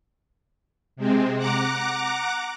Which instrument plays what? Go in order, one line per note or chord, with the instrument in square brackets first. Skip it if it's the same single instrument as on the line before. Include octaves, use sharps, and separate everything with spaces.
[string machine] C3 G#3 C4
F#5 A#5 D6 F#6